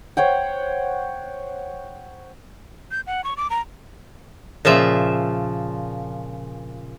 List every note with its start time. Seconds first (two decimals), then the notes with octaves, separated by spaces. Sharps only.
0.17 C5 C#5 F#5 G5
2.91 G6
3.07 F#5
3.24 C#6
3.37 D6
3.50 A#5
4.65 A#2 C#3 F3 E5